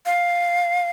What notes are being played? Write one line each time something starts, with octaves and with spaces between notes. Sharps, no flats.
F5